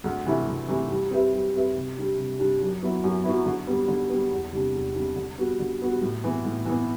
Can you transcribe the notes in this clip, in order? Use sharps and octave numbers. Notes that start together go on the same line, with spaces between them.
D2
C3 E3 A3 E4
D2
C3 E3 A3 E4
G3
C4 G4 B4 E5
G3
C4 G4 B4 E5
C3
G3 D4 G4
C3
G3 D4 G4
F#2
F#3 B3 E4
F#2
F#3 B3 E4
D3
G3 B3
D3
G3 B3
E2
C3 G3 D4
E2
C3 G3 D4
D3
G3 B3 F#4
D3
G3 B3 F#4
A2
E3 B3
A2
E3 B3